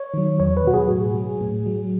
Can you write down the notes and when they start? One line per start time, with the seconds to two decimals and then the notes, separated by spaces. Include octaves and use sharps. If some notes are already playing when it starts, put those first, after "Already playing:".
Already playing: C#5
0.14 D#3 F#3
0.40 E2 C#5
0.57 B4
0.65 B2 F#3 F#4
0.74 G#4
0.90 A2
1.15 F#3
1.41 A2
1.66 F#3